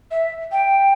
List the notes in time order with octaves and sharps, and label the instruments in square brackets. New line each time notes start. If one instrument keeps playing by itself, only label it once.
[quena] E5
G5